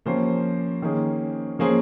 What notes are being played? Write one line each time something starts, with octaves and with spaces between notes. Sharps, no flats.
F3 A#3 C#4 G4 C5
D#3 A#3 C#4 G#4
F3 A#3 C#4 G#4 C5